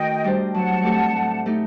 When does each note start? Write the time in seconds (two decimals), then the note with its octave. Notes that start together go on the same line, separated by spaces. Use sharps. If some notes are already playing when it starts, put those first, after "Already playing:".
Already playing: D#3 A3 F#4 D#5 G5
0.24 G3 D4 G4 C5
0.54 F#3 F#5 A5
0.83 A3 C4 G4 D5
1.15 A2
1.46 A3 D#4 G4